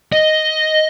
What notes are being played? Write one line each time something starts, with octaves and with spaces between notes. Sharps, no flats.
D#5